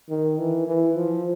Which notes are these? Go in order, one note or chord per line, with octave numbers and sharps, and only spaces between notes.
D#3
E3
E3
F3